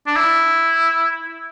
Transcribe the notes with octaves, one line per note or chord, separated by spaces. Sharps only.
D4
E4